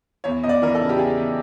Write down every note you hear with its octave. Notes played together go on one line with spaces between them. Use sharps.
E2 C#5
E2 D#5
D5
E3 A#4
A4
C#3
G4
E2 G#4
E2